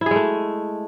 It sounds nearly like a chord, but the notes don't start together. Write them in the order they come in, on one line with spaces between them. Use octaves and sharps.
E4 G#4 G#3 A3